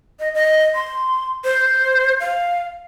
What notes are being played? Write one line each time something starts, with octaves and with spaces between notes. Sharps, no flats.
D#5
D#5
C6
C5
F5